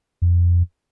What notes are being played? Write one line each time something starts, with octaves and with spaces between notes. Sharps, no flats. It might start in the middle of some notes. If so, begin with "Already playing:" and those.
F2